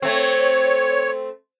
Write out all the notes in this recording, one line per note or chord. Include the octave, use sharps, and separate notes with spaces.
A3 C4 C#5